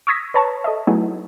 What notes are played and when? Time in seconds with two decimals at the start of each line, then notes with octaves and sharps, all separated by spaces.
0.07 C#6 D#6 E6 G#6 A#6 B6
0.34 B4 C#5 A5 A#5 C#6
0.64 A4 D#5 E5
0.87 F#3 A3 B3 D#4 E4 G#4